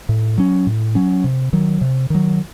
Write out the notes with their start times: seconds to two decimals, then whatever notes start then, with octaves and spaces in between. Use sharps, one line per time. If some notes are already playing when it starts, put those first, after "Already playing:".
0.09 A2
0.38 F#3 C#4
0.67 A2
0.95 F#3 C#4
1.24 C3
1.53 D#3 F#3
1.81 C3
2.10 D#3 F#3